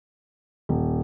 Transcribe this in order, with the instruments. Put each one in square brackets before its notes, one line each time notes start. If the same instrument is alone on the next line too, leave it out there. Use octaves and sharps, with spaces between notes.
[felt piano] D#1